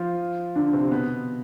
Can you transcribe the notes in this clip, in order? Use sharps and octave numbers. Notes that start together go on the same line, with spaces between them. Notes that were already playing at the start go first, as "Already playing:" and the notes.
Already playing: F3 F4
D3 D4
C3 C4
B2 B3